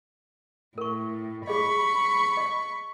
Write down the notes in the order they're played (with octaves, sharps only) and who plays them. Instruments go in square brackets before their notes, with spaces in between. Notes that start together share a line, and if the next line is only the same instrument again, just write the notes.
[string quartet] A2 [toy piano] A#4 C#6
[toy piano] G4 G#4 D#5 [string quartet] B5 C#6
[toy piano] D#5